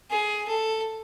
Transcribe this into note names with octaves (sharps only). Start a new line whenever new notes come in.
G#4
A4